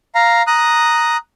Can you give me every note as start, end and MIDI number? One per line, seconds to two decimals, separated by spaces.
0.15 0.42 77
0.15 0.42 82
0.47 1.17 82
0.47 1.17 87
0.47 1.17 90